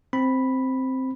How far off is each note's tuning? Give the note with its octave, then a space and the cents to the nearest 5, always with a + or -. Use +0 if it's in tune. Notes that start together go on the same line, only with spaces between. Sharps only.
C4 +0 B5 +0